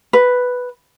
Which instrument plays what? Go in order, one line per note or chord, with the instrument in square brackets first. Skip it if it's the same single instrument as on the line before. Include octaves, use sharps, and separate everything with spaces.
[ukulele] B4